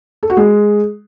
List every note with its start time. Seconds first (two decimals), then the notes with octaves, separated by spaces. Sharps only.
0.23 A4
0.30 F#4
0.37 G#3